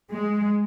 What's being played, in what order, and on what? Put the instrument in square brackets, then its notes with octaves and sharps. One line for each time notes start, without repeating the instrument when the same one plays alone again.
[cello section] G#3